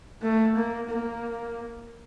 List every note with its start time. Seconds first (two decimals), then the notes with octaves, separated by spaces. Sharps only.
0.22 A3
0.56 A#3
0.90 A#3